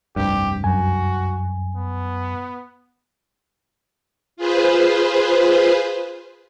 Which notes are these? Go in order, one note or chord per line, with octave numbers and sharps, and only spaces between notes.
F1 C2 G2 G4
F#2 F#4 G#5
B3
F4 G#4 B4 C5